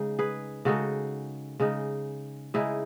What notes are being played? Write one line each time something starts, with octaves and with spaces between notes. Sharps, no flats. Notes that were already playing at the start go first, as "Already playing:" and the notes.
Already playing: C#3 G#3 D#4
G#4 B4
C#3 G#3 D#4 F#4 A4
C#3 G#3 D#4
C#3 G#3 D#4 E4 G#4